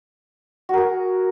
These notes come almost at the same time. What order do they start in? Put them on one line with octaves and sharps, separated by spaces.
F#4 A#4 G#4